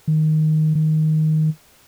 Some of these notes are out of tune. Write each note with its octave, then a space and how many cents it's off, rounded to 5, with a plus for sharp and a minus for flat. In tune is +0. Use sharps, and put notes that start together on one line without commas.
D#3 +0
D#3 +5